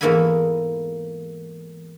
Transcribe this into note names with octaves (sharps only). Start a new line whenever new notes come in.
E2 G#2 A#3 A4 G#5 B5